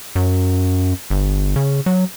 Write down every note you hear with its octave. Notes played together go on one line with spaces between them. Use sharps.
F#2
G1
C#3
F#3